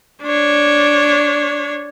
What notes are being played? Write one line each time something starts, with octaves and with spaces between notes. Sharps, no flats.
D4 C#5